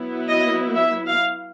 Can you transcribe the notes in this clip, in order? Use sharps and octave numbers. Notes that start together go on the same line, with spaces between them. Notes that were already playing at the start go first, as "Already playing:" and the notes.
Already playing: F#3 B3 E4
D#5
E5
F5